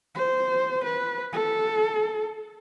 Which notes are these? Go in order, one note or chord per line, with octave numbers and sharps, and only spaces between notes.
C5
B4
A4